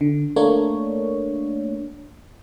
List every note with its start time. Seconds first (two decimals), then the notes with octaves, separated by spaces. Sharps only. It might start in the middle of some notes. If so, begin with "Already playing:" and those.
0.01 D3
0.36 A3 A#3 D4 C#5